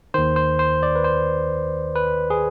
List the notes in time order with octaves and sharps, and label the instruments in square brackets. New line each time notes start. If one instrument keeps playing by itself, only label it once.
[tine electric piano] D#2 D#3 C5
C5
C5
D5
B4
C5
B4
G#4